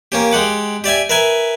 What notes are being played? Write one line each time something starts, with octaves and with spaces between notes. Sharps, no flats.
A#3 C#4 G4
G#3 G4 F#5 D6
G4 D5 E5 G#5
A#4 B4 E5 G#5